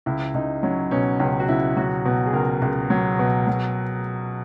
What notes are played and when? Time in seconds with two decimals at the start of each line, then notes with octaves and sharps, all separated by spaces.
0.06 C#2 E4
0.34 C#2 D#4
0.63 F#3 C#4
0.91 B2 C#4
1.20 C#2 C#4
1.40 F#4
1.48 C#2 E4
1.77 F#3 F#4
2.05 B2
2.26 G#4
2.33 C#2 A#4
2.62 C#2
2.90 F#3
3.19 B2
3.47 F#3